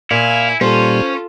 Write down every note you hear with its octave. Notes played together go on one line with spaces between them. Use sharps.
A#2 E4 F5 G#5 F6
A#2 G3 C#4 F4 A4 C5